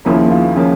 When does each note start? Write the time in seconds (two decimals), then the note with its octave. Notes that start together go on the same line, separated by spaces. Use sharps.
0.05 D#2 C#3 F3 A#3 E4
0.31 F4
0.56 C#3 F3 A#3